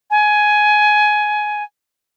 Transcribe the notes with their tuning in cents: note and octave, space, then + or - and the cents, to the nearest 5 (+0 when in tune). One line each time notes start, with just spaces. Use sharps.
G#5 +15